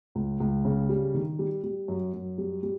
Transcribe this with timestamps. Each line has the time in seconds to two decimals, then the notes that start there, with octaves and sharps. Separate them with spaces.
0.15 C#2
0.40 C#2
0.65 C#3
0.89 G3
1.14 D#3
1.39 G3
1.64 G3
1.88 F#2
2.13 F#2
2.38 G3
2.63 G3